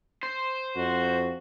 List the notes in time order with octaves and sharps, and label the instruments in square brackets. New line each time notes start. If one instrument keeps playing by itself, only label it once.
[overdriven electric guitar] C5
[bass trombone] F2 [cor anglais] F#4